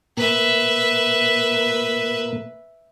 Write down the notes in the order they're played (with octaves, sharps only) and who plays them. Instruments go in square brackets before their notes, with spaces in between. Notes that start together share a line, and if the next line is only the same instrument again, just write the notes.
[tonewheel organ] A#2 A#3 [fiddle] B4 E5